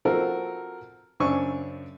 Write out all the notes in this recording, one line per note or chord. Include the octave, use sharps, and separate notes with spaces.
F3 C4 F#4 A4 A#4
F#2 C#3 C4 D4 G#5 C#6